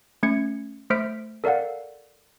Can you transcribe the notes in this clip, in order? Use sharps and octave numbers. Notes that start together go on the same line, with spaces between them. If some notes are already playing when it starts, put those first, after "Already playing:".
A3 C#4 G#6 C#7
A3 C5 F6 B6 D7
A4 A#4 D5 F5 F#5